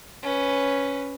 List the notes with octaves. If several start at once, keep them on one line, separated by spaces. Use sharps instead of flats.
C#4 B4